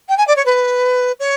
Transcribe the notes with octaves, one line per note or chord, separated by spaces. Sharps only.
G5
G#5
D5
C#5
B4
C#5